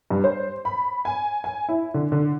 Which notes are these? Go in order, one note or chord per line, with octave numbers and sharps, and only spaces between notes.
G2
C5
B5
G#5
G#5
E4
D3
D3